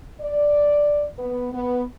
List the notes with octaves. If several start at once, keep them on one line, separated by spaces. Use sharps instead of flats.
D5
B3
B3